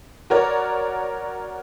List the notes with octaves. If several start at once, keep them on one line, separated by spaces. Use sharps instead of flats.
F#4 A#4 C#5 D5